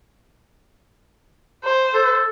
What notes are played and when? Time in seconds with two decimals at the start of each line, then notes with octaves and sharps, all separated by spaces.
1.64 C5
1.94 A4